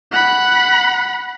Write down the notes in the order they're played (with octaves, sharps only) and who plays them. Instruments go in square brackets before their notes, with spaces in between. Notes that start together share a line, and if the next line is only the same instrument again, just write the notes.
[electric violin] F#5 B5